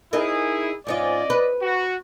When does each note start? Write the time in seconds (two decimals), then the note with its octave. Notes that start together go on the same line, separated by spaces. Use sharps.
0.13 D#4 E4 G#4 A#4
0.87 G#2 C#4 F4 D5 D#5
1.30 B4
1.62 F#4